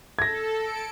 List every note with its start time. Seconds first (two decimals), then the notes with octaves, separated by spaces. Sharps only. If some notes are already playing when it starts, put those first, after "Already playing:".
0.19 A4 G#6 A#6
0.60 C#7 D7